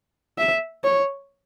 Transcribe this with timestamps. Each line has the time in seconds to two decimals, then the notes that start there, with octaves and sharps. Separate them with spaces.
0.38 E5
0.84 C#5